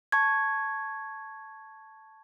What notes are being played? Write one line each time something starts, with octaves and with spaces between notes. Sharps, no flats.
A5 C#6 G#6